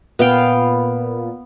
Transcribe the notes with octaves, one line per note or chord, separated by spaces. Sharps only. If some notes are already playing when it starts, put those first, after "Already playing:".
A#2 B3 F5 G5